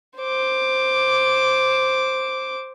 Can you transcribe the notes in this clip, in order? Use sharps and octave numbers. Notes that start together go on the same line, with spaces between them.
C5 D6